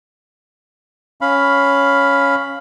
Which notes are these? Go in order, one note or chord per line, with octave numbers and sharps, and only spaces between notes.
C#4 F5 B5